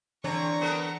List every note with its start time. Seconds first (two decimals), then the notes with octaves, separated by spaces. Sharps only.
0.24 D3 E3 C4 D4 C#5 A#5 C#6
0.61 B3 A4 A#4